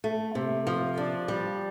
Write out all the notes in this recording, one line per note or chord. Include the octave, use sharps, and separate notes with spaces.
A3
C3
F3
D4
G3